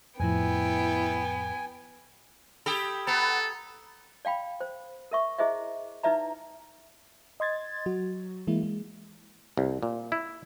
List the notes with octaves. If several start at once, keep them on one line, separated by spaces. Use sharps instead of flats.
F2 A2 F3 B3 E4 G5 G#5
G4 A4 B5 D#6 G#6
B3 A4 A#5
D5 F5 G5 B5
C5
A#4 E5 C#6
E4 G#4 C5 D#5 E5
D#4 E4 B4 D5 E5 A#5
D#5 C6 G#6 A6
F#3 F#4
E3 G#3 A#3 E4
G#3
C2
A#2
E4